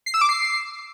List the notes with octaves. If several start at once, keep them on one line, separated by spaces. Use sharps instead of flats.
C7
E6
D6
C7